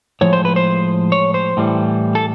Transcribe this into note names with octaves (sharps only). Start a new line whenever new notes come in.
A2 F3 G#3 C#5
C5
B4
C5
C#5
C5
A2 E3 G3
A4